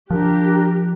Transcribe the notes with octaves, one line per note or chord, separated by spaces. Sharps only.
F3 D4 G4 A#4 F#6